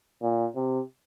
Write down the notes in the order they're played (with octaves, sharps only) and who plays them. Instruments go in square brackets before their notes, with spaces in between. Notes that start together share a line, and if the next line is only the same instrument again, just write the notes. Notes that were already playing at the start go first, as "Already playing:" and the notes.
[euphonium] A#2
C3